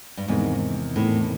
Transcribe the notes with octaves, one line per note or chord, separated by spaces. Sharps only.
G2
E2 G#2 C3 D#3
E2 A2 C3 D#3